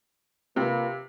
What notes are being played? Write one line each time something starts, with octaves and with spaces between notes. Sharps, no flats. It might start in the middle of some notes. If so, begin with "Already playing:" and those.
C3 A#3 F4 B4